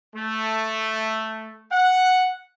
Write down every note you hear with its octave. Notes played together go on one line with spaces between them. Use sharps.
A3
F#5